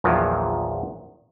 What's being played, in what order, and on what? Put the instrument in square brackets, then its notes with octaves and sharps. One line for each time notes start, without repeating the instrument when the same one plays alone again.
[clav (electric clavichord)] A#1 E2 A#2 D#3 F3 F#3